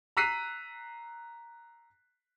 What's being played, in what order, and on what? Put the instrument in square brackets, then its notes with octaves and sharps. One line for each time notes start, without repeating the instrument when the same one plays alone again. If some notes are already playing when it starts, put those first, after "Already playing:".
[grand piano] A#5 E6 F#6 B6 C7 D#7